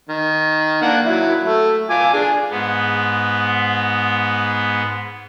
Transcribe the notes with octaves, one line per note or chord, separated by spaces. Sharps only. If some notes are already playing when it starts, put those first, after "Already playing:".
D#3
A#3 D4 F#5
F#3 E4
A3
F4 G#5 D6
D4 G#4
G#2 B3